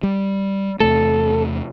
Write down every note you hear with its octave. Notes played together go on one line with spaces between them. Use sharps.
G3
E2 C3 A3 A4